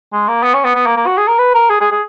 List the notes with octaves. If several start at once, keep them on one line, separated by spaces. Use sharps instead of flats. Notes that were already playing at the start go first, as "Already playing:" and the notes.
G#3
A#3
B3
C#4
B3
B3
A#3
A#3
F#4
G#4
A#4
B4
A#4
G#4
G#4
G#4